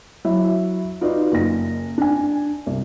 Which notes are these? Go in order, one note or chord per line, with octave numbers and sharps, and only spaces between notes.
F#3 E4 E5
D#4 F4 F#4 B4 D5
F#1 A#6
D4 G#5
C2